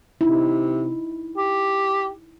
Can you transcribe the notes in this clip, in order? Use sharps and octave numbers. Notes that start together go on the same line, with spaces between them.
C3 D#4 E4
G4